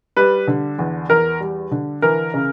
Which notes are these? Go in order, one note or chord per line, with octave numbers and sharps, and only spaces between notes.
G3 B4
D3
E2
E2 A#4
G3
D3
E3 A#4
C#3